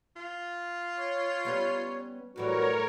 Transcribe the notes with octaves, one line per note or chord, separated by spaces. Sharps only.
F4
C#5
G3 B3 C#4
F#2 A2 E3 G3 F#4 A#4 C#5 D5